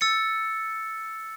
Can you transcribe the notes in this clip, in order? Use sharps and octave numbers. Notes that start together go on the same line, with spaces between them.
E6 A6 C#7